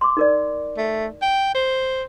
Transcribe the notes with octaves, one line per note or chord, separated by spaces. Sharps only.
C6 D6
D#4 A#4 D5
A3
G5
C5